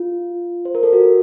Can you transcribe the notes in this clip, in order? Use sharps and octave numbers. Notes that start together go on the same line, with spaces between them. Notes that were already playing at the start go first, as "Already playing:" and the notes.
Already playing: F4
C5
A#4
A4
F#4